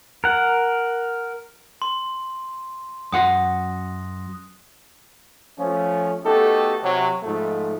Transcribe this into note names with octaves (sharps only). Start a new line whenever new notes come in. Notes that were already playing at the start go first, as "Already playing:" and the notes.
A#4 F#5
C6
F#2 F#5 C6 D#6 F#6 A#6
F3 A3 C#4
A3 B3 D#4 F#4 G4 A4
C3 F#3
G#2 F3 A3